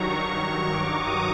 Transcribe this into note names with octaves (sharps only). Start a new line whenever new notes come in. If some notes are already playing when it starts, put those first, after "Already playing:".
Already playing: G2 D#3 F#3 A#5 C#6
C#6
D6
D#6